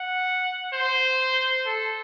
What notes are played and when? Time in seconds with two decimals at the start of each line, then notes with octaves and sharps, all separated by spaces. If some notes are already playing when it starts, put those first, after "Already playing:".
Already playing: F#5
0.73 C5
1.66 A4